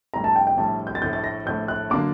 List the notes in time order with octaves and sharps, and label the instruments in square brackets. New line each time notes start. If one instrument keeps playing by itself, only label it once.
[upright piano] A#1 A2 G3 [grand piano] A#5
[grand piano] A5
G5
G5
[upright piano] A#1 A2 G3 [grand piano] A5
[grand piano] G6
A6
[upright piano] A#1 A2 A3 [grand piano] G6
[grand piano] A6
A#6
[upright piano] A#1 A2 A3 [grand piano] G6
[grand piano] F#6
[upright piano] D3 F#3 A#3 D4 [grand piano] D6